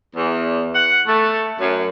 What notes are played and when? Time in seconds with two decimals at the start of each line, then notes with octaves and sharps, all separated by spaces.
0.15 E2
0.74 F#5
1.07 A3
1.60 F#2